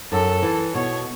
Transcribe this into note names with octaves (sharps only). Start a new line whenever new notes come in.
F#2 A4
E3
B2 C#5